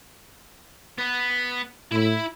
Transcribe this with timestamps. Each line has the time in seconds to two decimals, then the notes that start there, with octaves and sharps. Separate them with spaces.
0.98 B3
1.92 A2 E4 B5